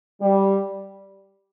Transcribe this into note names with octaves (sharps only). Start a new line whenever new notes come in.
G3